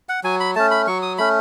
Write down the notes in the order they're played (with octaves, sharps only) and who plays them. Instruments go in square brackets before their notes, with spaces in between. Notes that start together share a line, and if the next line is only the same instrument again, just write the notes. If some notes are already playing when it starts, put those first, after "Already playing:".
[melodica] F#5
F#3 G#5
B5
A3 C#4 A5
B5
F#3 C#6
D#6
A3 C#4 B5